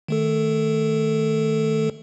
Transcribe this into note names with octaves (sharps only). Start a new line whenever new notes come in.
D#3 A3 A4